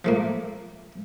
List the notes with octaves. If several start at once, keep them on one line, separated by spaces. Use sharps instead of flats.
F3 A3 A#3